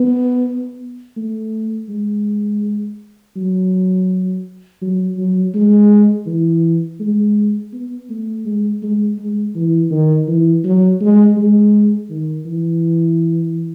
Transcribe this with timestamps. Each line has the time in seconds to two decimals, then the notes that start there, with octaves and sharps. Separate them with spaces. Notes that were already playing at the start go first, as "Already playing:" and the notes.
Already playing: B3
1.17 A3
1.89 G#3
3.36 F#3
4.82 F#3
5.17 F#3
5.55 G#3
6.27 E3
7.00 G#3
7.73 B3
8.10 A3
8.46 G#3
8.83 G#3
9.19 G#3
9.55 E3
9.91 D#3
10.28 E3
10.64 F#3
11.01 G#3
11.37 G#3
12.10 D#3
12.46 E3